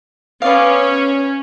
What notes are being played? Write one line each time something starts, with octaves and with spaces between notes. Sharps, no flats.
B3 C#4 D5 F5